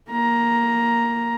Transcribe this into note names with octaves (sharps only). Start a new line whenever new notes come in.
A#3 A#5